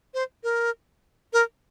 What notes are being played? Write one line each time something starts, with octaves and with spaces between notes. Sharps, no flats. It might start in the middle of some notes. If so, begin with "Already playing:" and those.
C5
A#4
A#4